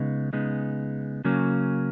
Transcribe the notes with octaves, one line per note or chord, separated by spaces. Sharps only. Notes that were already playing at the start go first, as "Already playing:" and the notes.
Already playing: C#3 G#3 B3 D#4
C#3 G#3 B3 D#4
C#3 F#3 A#3 C#4